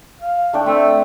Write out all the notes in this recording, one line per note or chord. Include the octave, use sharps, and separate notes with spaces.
F5
A3 D4 G5
A3 C4